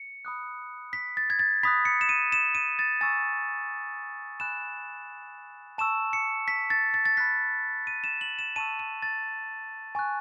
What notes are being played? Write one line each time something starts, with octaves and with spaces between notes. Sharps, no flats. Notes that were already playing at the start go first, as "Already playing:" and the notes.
Already playing: C#7
B5 D#6 F#6
B6
A6
G#6
A6
B5 D#6 F#6 B6
C#7
E7
D#7
E7
D#7
A6
G#5 C#6 E6 A6
G#5 B5 F#6 E7
A5 C#6 E6 E7
C#7
B6
A6
A6
A6
B5 F#6 B6
D#7
E7
F#7
E7
A5 C#6 E6 D#7
D#7
A6
G#5 C#6 F#6